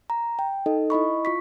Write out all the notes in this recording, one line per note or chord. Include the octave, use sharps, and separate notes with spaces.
A#5
G5
D#4 A4 D#5
E4 D#5 B5 C#6
F4 C#6 B6